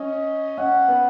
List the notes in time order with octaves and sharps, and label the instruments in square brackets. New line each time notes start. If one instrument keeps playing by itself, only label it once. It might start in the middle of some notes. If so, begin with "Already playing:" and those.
Already playing: [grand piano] C#4 [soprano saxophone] D#5
[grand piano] C#4 [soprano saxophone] F#5
[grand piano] B3